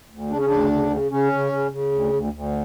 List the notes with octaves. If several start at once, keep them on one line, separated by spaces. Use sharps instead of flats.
D2
C#3 D4
C#4
D2 D4
C#3
C#3
C#3 C#4
C#3
C#3
C#3
D2
D2
D2